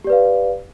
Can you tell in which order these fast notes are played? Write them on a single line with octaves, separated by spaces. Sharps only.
G4 D5 B4 F5